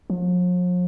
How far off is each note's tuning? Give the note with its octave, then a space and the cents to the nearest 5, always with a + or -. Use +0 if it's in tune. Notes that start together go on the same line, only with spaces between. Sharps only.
F3 +45